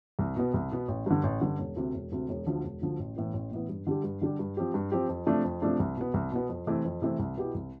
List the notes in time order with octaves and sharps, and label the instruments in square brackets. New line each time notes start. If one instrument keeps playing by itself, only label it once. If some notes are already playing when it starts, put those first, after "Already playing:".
[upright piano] C2
B2 B3
C2
B2 B3
A1
G2 D3
A1
G2 D3
E1
D2 C3
E1
D2 C3
E1
D2 D3 F3
E1
D2 D3 F3
A1
A2 E3 B3
A1
A2 E3 B3
G2
D3 G3 D4 G4
G2
D3 G3 D4 G4
G2
F3 C4 G4
G2
F3 C4 G4
F2
C3 F3 A3 D4
F2
C3 F3 A3 D4
C2
B2 B3
C2
B2 B3
F2
C3 E3 A3 C4
F2
C3 E3 A3 C4
C2
B2 B3 E4 G4
C2